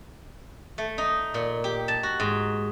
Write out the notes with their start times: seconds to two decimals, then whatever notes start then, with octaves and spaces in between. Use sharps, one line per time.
0.78 A3
0.98 D#4
1.34 A#2
1.64 G4
1.88 A5
2.03 F#4
2.20 G#2